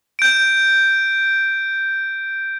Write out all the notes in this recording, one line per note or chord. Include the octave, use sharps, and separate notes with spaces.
G6 D7